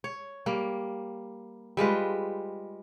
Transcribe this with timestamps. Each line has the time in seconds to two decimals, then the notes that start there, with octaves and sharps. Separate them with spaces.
0.04 C#5
0.46 G3 A#3
1.77 G3 G#3 F4 B4